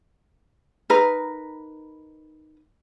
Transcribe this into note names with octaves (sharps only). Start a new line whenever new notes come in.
D#4 A#4 B4